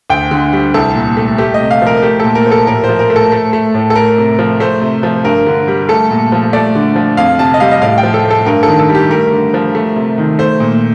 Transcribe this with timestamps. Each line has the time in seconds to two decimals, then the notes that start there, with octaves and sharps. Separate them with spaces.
0.10 D2 G5
0.31 D3
0.53 G3
0.74 C2 A4
0.95 A#2
1.17 A3
1.38 A3 G4
1.54 D#5
1.60 C3
1.71 F5
1.82 F3 A#4
2.02 A3 G4
2.20 A#2 A4
2.35 A#4
2.46 F3
2.52 A4
2.67 A2 A#4
2.84 C5
2.89 F3
2.99 A#4
3.10 A3
3.16 A4
3.32 A3
3.53 A3
3.74 A2
3.90 A4
3.95 A3 A#4
4.18 C3
4.39 F3
4.60 A3 C5
4.82 C3
5.03 F3
5.25 G2 A#4
5.46 D3
5.68 G3
5.89 A3 A4
6.11 A#2
6.32 F3
6.53 A3 D5
6.75 D3
6.96 F3
7.17 F2 F5
7.39 C3 A5
7.54 D#5
7.60 G3 F5
7.71 D#5
7.82 A2 F5
7.98 G5
8.03 F3
8.14 A4
8.25 A3
8.31 A4
8.46 G2 A#4
8.63 D#3 A4
8.79 A4
8.89 G3
8.95 G4
9.11 A3 A#4
9.32 D3
9.54 F3
9.75 A3
9.96 C3
10.18 D#3
10.39 A3 C5
10.60 A#2